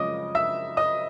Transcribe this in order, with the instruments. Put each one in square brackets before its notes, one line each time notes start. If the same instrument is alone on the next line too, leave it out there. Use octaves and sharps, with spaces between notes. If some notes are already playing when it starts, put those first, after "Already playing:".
Already playing: [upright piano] F#2 C#3 F3 G#3 C#5 D#5 D6 D#6
E5 E6
D#5 D#6